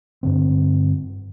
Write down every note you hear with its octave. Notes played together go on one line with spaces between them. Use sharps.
G2 D3 C4